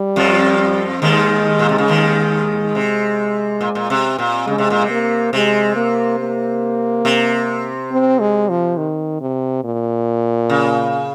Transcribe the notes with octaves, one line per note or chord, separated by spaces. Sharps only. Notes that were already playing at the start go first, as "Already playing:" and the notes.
Already playing: G3
F2 F3
D#2 D#3 G#3
A#2
C3
C#3
D#2 D#3
C3
A#2
A#2
C3
A#2
C#3 G#3
C3
A#2
C3
A#3
C3 G#3
A#3
A#3
C3
C4
G#3
F3
D#3
C3
A#2
C#3